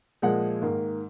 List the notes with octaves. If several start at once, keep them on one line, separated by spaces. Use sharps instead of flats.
A#2 F3 G#3 F#5
G#2 D#3 A#3